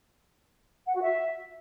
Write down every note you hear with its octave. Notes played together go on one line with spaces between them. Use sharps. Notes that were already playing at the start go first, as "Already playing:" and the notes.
F#5
F#4
E5